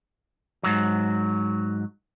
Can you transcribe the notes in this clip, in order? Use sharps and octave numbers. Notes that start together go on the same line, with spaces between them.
G#2 F#3